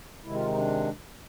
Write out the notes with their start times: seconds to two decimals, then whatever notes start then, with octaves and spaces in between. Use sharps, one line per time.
0.23 C3 D#3 G#3 E4
0.35 F4
0.46 D#4
0.56 D4